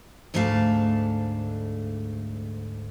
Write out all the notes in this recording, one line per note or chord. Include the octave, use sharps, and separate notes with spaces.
D2 G#2 A3 D4 F5 A5